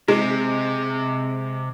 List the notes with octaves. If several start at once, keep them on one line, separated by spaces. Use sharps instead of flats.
C3 G#3